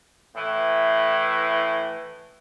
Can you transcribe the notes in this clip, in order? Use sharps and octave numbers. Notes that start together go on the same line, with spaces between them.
A2 E3